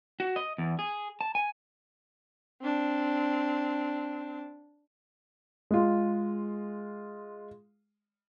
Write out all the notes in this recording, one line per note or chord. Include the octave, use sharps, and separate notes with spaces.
F#4
D#5
E2
G#4
A5
G#5
C4 D4
G#3 F4